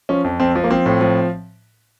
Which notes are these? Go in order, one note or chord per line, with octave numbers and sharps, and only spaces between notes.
F3 C#4
F2
F2 C4
F3
A#3
F3 C4
A2
F3